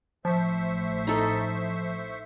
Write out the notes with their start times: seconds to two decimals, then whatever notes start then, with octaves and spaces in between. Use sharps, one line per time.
0.25 A1 A2 F3 C5 E5 C#6
1.07 D#4 A4